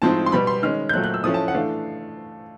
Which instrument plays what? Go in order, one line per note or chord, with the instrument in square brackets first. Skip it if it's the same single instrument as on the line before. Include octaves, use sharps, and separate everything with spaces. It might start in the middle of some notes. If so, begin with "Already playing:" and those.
[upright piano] A2 F3 G#3 C4 D#4 A5
C6
B2 G3 B3 B5
C6
D#3 G#3 C#4 F6
G6
A#2 F#3 A3 F#6
F#6
E6
A2 F3 A3 C#4 D#6
A5
F#5
E3 A3 D4 F5